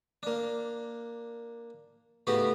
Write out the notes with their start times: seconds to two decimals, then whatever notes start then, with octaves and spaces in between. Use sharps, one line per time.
0.23 A#3 D4
2.27 A2 C#3 B3 F#4 G4